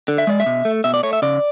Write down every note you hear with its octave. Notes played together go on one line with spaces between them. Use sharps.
D3
E5
G#3 D5
E5
B2
A3
B2 E5
D5
A3 C#5
E5
C#3 D5